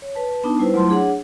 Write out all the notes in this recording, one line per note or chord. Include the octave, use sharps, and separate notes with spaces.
C#5
B4 A5
B3 D4 D#4 A5
G3 E4 B4 C5
F#3 A3 E4 F4 A5 C6
D4 G#4 C#5 F#5